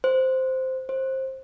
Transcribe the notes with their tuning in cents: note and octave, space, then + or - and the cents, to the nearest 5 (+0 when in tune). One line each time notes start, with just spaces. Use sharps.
C5 -5
C5 +15